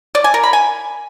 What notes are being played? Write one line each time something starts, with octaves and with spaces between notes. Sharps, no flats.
D5
G#5
A#4
B5
G#5